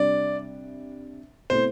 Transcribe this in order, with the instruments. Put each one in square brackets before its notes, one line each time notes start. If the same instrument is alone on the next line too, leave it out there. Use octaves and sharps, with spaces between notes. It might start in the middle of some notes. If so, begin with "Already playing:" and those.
Already playing: [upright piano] C3 G3 D4 [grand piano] D5
[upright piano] B2 A3 C4 E4 [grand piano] C5